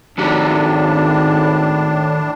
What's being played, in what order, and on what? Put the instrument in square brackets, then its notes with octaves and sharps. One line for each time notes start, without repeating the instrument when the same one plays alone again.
[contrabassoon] G#1 [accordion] A2 D4 [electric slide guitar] D#3 F#4 G4